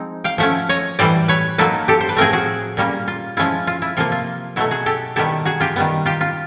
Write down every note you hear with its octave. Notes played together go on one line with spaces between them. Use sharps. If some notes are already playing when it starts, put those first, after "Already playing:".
Already playing: F3 G#3 C4 D#4 A#5
F5 G5
F3 A3 C#4 E5 F#5
C#5 D#5
A2 E3 G3 C5 D5
B4 C#5
F#3 A#3 D#4 A4 B4
G4 A4
C5
B4
A2 F3 A3 C4 G#4 A#4
F#4 G#4
A#2 G3 A#3 C#4
F4
F3 G#3 C#4 E4 F4
F4
E4
C3 F3 A#3 F4
F4
B2 F#3 A3 E4 F#4
F#4 G#4
G4 A4
D#3 G3 B3 E4 G4 A4
F#4 G#4
F4 G4
D#3 G3 B3
F4 G4
F4